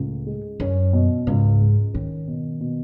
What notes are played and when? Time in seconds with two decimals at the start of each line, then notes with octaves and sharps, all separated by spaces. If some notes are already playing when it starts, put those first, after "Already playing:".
Already playing: C#2 A2
0.26 G#3
0.60 F#2 C#4
0.93 B2
1.27 C#2 G#2
1.61 G#3
1.94 D#3 C#4
2.28 B2
2.61 B2